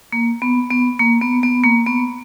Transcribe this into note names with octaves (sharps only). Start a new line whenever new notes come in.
A#3
B3
B3
A#3
B3
B3
A#3
B3